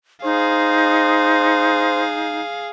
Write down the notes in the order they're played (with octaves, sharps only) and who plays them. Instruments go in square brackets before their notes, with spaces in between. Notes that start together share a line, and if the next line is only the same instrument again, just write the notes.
[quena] D#4 [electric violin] G#4 F5 [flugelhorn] C5